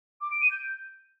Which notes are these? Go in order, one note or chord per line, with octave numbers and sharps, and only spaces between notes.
D6
D7
D#7
G6